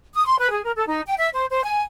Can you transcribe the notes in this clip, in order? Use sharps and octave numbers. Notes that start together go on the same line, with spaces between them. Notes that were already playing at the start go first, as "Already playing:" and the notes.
D#6
C6
B4
G#4
A#4
A4
D#4
G5
E5
C5
C5
G#5